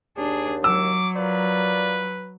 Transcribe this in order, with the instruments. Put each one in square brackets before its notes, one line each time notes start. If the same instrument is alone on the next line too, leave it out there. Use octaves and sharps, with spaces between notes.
[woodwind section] D#2 [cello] D4 [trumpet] G#4
[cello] F#3 [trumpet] D6 [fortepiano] E6
[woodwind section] F4 A#4 D5 [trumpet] B4